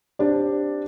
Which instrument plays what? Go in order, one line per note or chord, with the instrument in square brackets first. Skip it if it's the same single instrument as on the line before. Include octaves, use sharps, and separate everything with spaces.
[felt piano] C4 D4 G4 D5